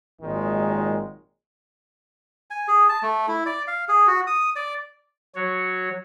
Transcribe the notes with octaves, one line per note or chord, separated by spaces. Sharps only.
G#1 A#2 D#3 F#3 G#3
G#5
G#4
A5
A3
E4
D5
F5
G#4
F#4
D#6
D5
F#3 F#4 C#5